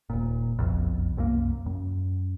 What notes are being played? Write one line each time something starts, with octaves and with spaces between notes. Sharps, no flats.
D#1 G#1 A#2
F#1 B1 F2
C2 F#2 A3 A#3
F#2